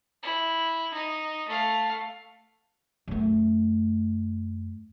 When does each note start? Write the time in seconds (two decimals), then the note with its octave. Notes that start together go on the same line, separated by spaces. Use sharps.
0.23 E4
0.94 D#4
1.49 A3 F5
3.08 F#2 A3